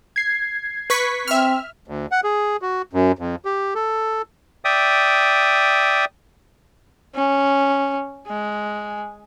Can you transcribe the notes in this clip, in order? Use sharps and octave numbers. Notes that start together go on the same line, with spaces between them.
G#6 C7
B4 C#6 B6
C4 E5 F6
D2
F#5
G#4
F#4
F#2
F2
G4
A4
D5 E5 G5 D#6
C#4
G#3